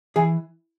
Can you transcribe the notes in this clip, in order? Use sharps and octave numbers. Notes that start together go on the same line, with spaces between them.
E3 G#4